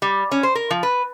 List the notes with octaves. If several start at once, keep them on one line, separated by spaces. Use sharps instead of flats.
G3
C#4
C5
A#4
F3
B4